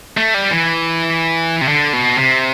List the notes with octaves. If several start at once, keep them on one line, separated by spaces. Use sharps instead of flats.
A3
G3
E3
C3
D3
B2
C3